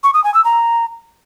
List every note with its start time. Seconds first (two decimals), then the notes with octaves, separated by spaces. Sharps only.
0.03 C#6
0.14 D#6
0.24 G#5
0.34 E6
0.44 A#5